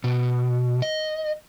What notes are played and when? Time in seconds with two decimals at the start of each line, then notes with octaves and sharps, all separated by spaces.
0.04 B2
0.82 D#5